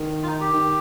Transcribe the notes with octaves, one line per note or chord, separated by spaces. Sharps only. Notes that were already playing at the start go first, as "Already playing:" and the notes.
Already playing: D#3
F4
D#4
G4
D#3